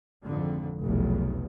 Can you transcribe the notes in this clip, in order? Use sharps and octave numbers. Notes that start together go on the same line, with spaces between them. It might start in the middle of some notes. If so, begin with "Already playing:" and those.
G#1 F2 D3
F1 B1 E2